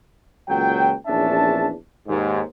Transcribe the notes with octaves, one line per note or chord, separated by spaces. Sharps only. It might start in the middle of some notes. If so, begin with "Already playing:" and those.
C#2 A#2 F#3 G5
A#1 E2 C#4 D4 E5 A5
D#2 G#2